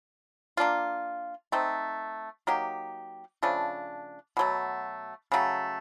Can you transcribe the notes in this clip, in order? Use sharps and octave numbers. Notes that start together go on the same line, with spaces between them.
A#3 D4 F4
A3 C4 D#4
F#3 A#3 D#4 G4
C#3 F3 A3 D4
B2 F#3 A3
C#3 F#3 A3